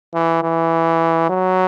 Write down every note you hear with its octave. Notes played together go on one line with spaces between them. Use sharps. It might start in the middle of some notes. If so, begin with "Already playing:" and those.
E3
E3
F#3